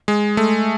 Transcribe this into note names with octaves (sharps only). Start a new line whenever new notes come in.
G#3
A3